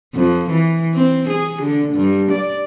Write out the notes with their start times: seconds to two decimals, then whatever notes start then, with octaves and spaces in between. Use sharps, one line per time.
0.15 F2
0.50 E3
0.94 C4
1.29 G#4
1.62 D3
1.95 G2
2.32 D5